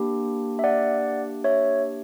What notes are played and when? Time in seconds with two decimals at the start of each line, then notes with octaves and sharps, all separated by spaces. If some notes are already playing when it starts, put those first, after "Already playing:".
Already playing: A#3 D4 G4
0.59 E5
0.64 D5 F#5
1.44 C#5 E5